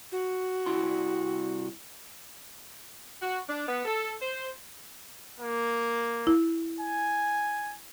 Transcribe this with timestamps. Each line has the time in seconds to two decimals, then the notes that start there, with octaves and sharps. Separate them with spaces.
0.12 F#4
0.66 C2 E4 C6
3.22 F#4
3.49 D4
3.67 B3
3.85 A4
4.20 C5
5.40 A#3
6.27 E4
6.81 G#5